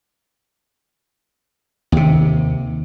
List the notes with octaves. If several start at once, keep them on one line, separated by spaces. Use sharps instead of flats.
D#2 C3